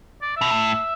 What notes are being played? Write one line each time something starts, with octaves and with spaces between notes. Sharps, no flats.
D5
B2 E5
A2